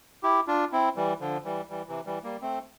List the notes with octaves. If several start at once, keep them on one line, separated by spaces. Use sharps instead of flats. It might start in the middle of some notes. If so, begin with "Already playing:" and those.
E4 G4
D4 F4
C4 E4
E3 G3
D3 F3
E3 G3
E3 G3
C3 E3
E3 G3
G3 A#3
A3 C4